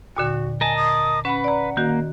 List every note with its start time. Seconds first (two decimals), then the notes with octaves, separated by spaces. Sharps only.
0.17 D#2 A#2 D3 F#4
0.61 A#4 D#5 G#5 A5
0.77 D#6
1.25 C#4 B4 F#5 B5
1.44 D5 A#5
1.77 D#3 A#3 F#4